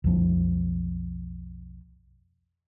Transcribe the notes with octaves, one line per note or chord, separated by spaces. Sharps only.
B1 F2 F3